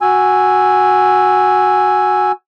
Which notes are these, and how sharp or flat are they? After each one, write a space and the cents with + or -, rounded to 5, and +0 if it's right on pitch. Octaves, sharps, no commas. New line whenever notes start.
F#4 +0 G#5 +0 E6 +0